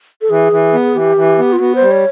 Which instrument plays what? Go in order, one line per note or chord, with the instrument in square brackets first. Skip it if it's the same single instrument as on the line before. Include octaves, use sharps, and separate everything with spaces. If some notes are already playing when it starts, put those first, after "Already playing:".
[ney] A4
[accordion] E3 [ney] G#4
[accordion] E3
B3
[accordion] E3 [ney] G4
[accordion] E3
B3
[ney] F4
[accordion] B3 [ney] F#4
[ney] C5
[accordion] G3
[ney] C#5